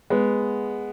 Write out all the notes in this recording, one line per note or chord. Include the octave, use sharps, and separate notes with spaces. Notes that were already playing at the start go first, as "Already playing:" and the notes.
G#3 B3